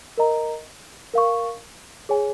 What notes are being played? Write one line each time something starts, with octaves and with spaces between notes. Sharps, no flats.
A#4 D#5 A#5
A#4 F5 C#6
G#4 C#5 G#5